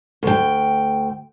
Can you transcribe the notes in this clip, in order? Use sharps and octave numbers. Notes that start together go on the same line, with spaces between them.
D2 G5